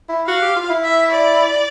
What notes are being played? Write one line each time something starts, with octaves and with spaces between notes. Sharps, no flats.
E4
F#4 F5
G4
F4
E4
E5
D5